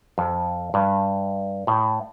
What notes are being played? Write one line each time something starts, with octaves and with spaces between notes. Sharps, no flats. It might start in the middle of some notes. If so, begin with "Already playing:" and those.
F2
G2
A2